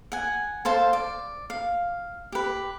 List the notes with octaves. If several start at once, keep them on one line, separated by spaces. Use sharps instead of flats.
F#5 G#5
A4 C5 F5 A5
D5
F5
G4 B4